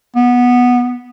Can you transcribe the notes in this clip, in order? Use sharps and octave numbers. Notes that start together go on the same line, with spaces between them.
B3